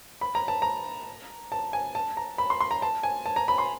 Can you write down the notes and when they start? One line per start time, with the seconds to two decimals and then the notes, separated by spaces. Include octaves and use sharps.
0.21 B5
0.35 A#5
0.48 A5
0.62 A#5
1.52 A5
1.73 G#5
1.95 A5
2.17 A#5
2.38 B5
2.50 C6
2.61 C6
2.71 A#5
2.82 A5
3.03 G#5
3.26 A5
3.36 A#5
3.48 B5
3.58 C6